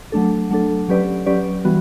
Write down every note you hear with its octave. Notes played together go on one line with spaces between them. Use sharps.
F#3 A3 D4 A4
F#3 A3 D4 A4
F#3 C#4 G4 B4 D5
F#3 C#4 G4 B4 D5
E3 G3 B3 F#4